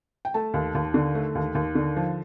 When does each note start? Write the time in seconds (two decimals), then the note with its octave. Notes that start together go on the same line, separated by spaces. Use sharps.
0.25 G5
0.34 A3 A5
0.54 D#2
0.75 D#2
0.94 D3
1.15 A3
1.35 D#2
1.55 D#2
1.75 D3
1.96 F3